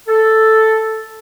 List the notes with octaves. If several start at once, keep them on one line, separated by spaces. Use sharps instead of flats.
A4